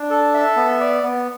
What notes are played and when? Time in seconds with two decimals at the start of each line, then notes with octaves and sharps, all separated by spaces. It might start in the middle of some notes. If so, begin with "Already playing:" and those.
Already playing: D4
0.10 A4
0.34 E5
0.57 B3
0.80 D5
1.03 B3